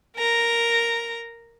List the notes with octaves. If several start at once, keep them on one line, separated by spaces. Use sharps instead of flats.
A#4 A#5